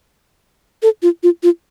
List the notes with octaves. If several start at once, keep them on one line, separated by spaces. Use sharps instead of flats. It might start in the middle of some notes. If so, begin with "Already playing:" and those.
A4
F4
F4
F4